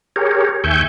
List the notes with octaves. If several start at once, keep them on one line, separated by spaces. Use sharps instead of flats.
G4 G#4 A#4 C#5
D#2 E5 G5 G#5 C#6 G6